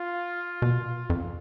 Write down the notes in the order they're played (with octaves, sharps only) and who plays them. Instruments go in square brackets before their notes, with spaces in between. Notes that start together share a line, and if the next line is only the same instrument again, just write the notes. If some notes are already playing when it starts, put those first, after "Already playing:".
Already playing: [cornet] F4
[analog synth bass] B2
F2